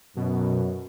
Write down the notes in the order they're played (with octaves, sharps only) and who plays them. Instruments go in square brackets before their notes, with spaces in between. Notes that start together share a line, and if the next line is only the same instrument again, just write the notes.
[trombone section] F#2 [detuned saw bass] B2